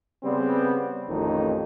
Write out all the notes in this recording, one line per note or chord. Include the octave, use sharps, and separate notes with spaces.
C#3 G3 B3 C4
A1 F2 A2 D#3 D#4